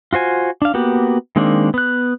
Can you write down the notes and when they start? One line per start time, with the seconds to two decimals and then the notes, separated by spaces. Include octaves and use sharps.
0.13 F4 F#4 C5 G#5
0.62 D4 F5
0.74 A#3 B3 F#4 G4
1.36 D#3 G#3 A#3 C4 D4
1.74 B3 F#6